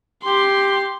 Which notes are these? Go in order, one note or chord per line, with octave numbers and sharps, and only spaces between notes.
G4 C6